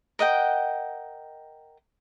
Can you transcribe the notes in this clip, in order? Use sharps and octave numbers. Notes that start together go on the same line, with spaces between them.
A#4 D#5 F#5 G5